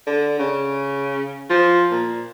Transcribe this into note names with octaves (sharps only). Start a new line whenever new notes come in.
D3
C#3
F3
A#2